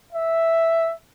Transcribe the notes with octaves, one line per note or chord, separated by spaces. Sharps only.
E5